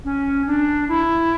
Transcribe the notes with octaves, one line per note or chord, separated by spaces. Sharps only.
C#4
D4
E4